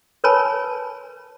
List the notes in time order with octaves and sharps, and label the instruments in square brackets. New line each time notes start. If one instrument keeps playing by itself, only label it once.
[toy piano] A#4 B4 C#5 G#5 A5 B5